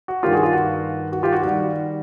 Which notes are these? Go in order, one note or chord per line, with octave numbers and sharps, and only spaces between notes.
F#4
G2 D#3 G3 A#3 D4 F4 G4
F#4 G#4
F4
F#4
F#4
F4 G4
F#4
D#3 G3 F#4